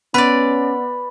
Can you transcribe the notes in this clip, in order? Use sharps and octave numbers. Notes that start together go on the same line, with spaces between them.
B3 C#4 B4 D5 B5